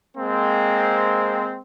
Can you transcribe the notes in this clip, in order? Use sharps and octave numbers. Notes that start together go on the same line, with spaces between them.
G#3 A#3 C4